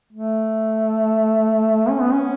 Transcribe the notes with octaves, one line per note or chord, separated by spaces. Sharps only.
A3
C#4
B3
C#4